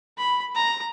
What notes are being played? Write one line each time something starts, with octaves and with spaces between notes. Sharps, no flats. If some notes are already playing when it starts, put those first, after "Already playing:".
B5
A#5